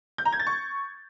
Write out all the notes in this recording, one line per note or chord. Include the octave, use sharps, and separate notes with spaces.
G6
A#5
G#6
A6
C#6